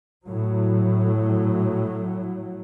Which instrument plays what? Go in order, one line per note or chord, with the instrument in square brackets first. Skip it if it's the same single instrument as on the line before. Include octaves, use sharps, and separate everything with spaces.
[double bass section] A2 F#3